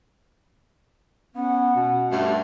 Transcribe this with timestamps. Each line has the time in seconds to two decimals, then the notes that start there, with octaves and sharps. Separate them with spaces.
1.35 B3 C#4 F#5
1.75 B2 C#4
2.11 G2 A3